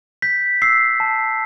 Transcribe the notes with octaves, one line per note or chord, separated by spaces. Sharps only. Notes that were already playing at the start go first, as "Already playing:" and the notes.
G6 B6
E6 C7
A5